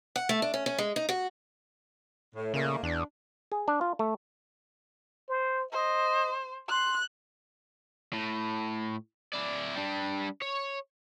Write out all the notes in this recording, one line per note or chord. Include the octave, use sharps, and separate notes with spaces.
F#5
A3
D4
C#4
C#4
G#3
D#4
F#4
A2
A#2 C#3 A3 A#3
E2 D4
G#4
D4
F4
A3
C5
C5 D#5
C6 F#6
A2
E4 D5
G3 D4
C#5